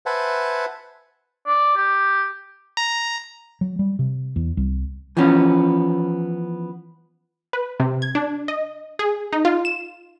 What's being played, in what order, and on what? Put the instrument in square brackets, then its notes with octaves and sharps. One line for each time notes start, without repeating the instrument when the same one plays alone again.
[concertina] B4 C5 E5 F#5 G#5 A5
[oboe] D5
G4
[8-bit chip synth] A#5
[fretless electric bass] F#3
G3
C3
E2
C2
[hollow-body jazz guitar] E3 F3 B3 C#4
[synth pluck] B4
C3
G#6
D4
D#5
G#4
D#4
F4
E7